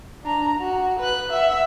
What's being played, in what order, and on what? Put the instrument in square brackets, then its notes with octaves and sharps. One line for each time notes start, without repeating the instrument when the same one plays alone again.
[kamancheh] D4 A#5
F#4
B4 F#6
E5 F#5